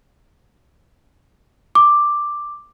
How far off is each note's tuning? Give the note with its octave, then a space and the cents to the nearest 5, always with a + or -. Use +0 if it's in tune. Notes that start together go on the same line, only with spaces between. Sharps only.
D6 +5